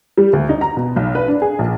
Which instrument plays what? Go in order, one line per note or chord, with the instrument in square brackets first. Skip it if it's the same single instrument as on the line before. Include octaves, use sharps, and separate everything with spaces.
[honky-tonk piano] G3
D2
D#4
A#5
B2
B1
B4
D4
G#4
A#1